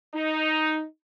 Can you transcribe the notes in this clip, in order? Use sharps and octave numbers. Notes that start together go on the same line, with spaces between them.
D#4